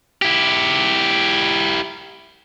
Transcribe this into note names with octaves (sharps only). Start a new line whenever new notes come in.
E4 G4